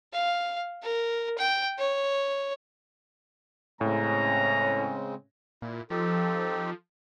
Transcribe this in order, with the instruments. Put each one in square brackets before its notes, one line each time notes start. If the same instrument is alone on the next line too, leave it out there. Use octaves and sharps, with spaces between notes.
[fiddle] F5
A#4
G5
C#5
[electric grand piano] A2 [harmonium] C#3 G#3 C4 [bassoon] C#4 [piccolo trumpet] A#5
[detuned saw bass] A#2 [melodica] E4
[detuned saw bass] F3 [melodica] C4 D#4 G4 [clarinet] A4